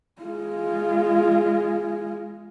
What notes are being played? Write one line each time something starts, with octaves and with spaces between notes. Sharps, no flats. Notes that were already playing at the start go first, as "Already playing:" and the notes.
G#3 F4